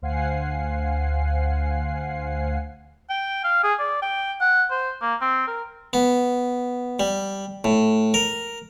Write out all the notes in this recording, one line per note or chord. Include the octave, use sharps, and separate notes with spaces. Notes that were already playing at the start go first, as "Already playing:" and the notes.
D2 C5 F5 F#5 G#5 C7
G5
F5
G#4
D5
G5
F#5
C5
A#3
C4
A#4
B3
G3
A2
A#4